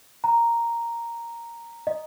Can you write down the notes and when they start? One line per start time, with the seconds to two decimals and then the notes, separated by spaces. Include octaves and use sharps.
0.24 A#5
1.87 D#5